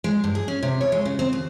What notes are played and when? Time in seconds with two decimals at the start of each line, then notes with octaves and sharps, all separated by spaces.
0.04 G#3
0.24 G2
0.35 G#4
0.48 C#4
0.63 C3
0.81 C#5
0.92 G#3
1.06 C#3
1.19 C4
1.33 D#2